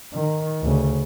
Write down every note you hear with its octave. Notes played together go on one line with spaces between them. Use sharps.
D#3
D2 C#3